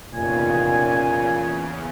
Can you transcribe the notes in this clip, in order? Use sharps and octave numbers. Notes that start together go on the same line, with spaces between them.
F1 E2 A#2 C#3 G#5